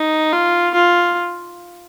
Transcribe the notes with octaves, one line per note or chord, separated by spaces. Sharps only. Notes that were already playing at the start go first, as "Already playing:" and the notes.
Already playing: D#4
F4
F4